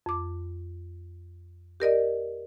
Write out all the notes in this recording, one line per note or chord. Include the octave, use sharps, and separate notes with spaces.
F2 D6
G4 A#4 D5 D#5